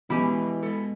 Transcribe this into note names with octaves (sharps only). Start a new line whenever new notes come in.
B2 E3 F#3 G#3 E4 G4 G#5
G#3 B3 A4